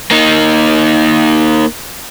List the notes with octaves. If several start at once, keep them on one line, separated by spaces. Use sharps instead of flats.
A#3 D#4